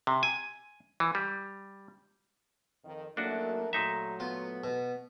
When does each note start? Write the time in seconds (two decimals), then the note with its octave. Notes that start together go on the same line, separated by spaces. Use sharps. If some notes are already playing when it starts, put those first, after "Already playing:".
0.07 C3
0.23 G#5
1.00 E3
1.15 G3
2.85 F2 D#3
3.17 F#2 A3 A#3 D4 F#4 A#4
3.73 A#2 F#3 A3 D#4 E5 A#5
4.20 B3 F4
4.64 B2